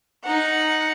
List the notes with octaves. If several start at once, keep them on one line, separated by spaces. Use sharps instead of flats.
D#4 F#5